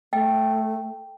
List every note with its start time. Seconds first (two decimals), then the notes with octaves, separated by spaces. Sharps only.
0.13 A3 G5